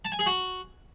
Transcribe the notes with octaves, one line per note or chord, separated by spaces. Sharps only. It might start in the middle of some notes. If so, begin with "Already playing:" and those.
A5
G#5
G#4
F#4